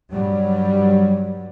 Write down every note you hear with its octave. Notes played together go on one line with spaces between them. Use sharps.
G2 F#3 G3